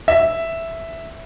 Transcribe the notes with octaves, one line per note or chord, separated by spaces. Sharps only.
E5